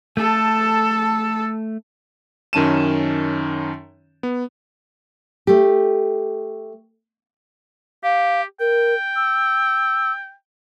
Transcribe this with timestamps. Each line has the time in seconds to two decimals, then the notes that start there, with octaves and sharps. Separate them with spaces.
0.17 A3 A4 A5
2.53 F#2 D#3 C#4 A5 D#7 E7
4.23 B3
5.47 A3 G4
8.04 G4 F5
8.60 A#4 G5
9.16 E6